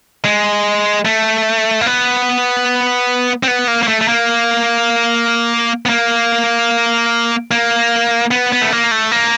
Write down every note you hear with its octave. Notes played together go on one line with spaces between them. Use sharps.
G#3
A3
A#3
B3
C4
B3
A#3
A#3
A3
A3
A#3
B3
A#3
A#3
B3
B3
A3
A#3
A3
A#3